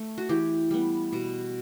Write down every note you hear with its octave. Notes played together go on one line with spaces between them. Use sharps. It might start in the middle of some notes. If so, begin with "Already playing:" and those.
Already playing: A3
F#4
E3 G4
G3 B3
B2